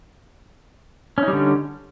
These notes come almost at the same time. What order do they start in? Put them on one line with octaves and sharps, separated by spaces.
C#4 D#4 G3 D3